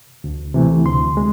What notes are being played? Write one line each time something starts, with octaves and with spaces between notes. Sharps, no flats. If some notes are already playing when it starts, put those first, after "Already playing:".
D2
C3 E3 A3
D2 C6
G#3